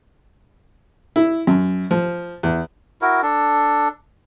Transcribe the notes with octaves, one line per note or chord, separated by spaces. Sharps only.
E4
F#2
F3
E2
E4 F#4 A#4
D4 A4